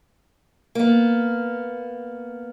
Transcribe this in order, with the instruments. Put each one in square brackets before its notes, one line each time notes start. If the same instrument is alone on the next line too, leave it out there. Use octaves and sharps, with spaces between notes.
[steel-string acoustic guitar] A#3 B3